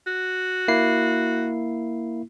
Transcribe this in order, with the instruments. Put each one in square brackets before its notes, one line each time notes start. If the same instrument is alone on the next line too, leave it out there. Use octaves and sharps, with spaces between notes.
[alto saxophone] F#4
[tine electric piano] A#3 E4 C7